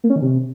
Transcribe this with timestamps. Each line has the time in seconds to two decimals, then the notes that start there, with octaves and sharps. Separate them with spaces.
0.04 A#3
0.10 C#4
0.16 D#3
0.22 C3